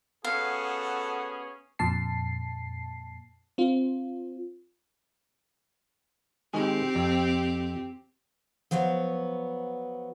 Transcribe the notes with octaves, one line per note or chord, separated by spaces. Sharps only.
B3 C#4 F#4 G#4 A4 F5
F2 A#2 A5 C7
C4 F4
D#3 G#3 C4 G4 G#4
F2
F3 F#3 B3 C#5